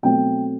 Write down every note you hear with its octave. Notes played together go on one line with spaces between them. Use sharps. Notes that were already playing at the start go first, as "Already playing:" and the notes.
B2 F#3 A3 C4 G5